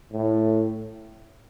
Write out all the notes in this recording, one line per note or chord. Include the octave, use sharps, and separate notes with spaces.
A2